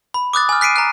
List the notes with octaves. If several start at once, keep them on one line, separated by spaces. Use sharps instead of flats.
B5
D6 D#6 F#6 A6
G#5 F6
F#6 B6 C7 D7 D#7
A#5 F#6